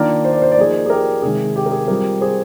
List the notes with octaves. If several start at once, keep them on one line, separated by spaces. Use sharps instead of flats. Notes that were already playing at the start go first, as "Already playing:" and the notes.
Already playing: D#3 A#3 D4 F4 A#4 D5
C5
D5
C5
D5
F3 A#3 D#4 G#4 C5
G#4
G4 A#4
C3 D#3 G#3 G#4
G4
A#4
G#4
G3 C4 F4 G4 A#4
G#4 C5